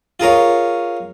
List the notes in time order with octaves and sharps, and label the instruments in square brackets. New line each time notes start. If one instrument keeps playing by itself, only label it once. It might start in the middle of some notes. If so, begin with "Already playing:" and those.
[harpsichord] F4 G#4 A#4 C#5